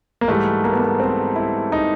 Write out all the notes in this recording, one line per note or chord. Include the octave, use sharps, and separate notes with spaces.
A#3
G#2 E3 G3 A3
A#3
B3
A#3
C4
E4
D#4